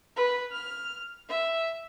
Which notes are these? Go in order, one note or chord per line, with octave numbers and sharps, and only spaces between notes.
B4
F6
E5